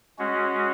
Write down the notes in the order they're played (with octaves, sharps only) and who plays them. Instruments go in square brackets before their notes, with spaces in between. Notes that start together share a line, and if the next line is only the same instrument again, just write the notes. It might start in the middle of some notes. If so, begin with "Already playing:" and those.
[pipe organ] G#3 C#4 F#4